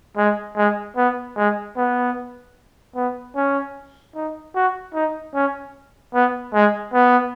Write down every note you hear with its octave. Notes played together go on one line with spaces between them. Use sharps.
G#3
G#3
B3
G#3
B3
B3
C#4
D#4
F#4
D#4
C#4
B3
G#3
B3